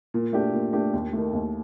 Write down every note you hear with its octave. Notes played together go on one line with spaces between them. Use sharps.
A#2
A3 D4 G4
A#2
A3 D4 G4
D#2
D#3 A3
D#2